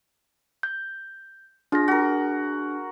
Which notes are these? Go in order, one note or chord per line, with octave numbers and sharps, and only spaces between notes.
G6
D4 F4 G#4 A#6
F#4 A#4